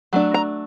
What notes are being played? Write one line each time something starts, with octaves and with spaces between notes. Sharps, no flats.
F#3 A3 D4
A#5